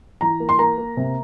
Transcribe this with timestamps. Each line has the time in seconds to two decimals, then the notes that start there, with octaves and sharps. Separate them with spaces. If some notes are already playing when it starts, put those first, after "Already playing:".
0.21 E3 A#5
0.40 A#3
0.49 C6
0.59 A#3 A#5
0.78 A#3
0.97 C3